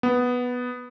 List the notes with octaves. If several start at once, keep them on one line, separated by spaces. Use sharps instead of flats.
B3